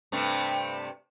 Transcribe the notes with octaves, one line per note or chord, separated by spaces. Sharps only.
G2 C3 A3